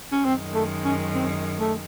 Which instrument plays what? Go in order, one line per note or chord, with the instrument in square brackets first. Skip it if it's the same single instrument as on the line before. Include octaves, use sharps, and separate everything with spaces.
[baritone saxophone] C#4
[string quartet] F#2 D#3 G#3 [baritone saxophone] C4
[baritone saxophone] A3
C#4
C4
A3